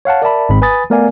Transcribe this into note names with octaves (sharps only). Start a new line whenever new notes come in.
C#5 F5 F#5 A5
A#4 D5 E5 A5 B5
G#1 G#2 G#3 C4 B5
B4 G#5 B5 D#6 A6
A3 B3 A#4 D5 F5 G#5